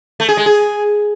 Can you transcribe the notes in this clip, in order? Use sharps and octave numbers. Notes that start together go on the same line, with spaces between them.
A3
G#4
G#3
G#4